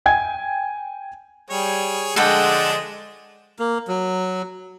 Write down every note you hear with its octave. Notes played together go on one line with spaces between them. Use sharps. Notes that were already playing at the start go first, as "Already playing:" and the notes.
G5 G#5 G#6
G3 G#4 C#5
D3 F3 G#3 D4 A4 F#5 G5
A#3
F#3